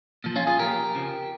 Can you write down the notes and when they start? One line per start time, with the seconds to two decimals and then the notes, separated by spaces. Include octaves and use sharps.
0.24 A#2 F3
0.36 C#4 F4
0.47 F4 G#4
0.59 A#2 F3 G4 A#4
0.94 F2 C#3 F3